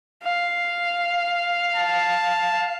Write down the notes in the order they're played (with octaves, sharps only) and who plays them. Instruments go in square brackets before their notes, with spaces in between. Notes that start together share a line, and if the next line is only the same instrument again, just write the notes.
[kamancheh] F5
[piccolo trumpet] A5